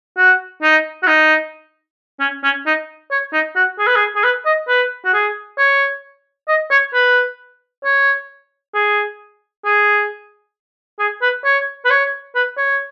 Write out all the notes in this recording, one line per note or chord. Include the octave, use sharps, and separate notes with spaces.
F#4
D#4
F#4
D#4
C#4
C#4
D#4
C#5
D#4
F#4
G#4
B4
G#4
G#4
B4
D#5
B4
F#4
G#4
C#5
D#5
C#5
B4
C#5
G#4
G#4
G#4
B4
C#5
B4
C#5
B4
C#5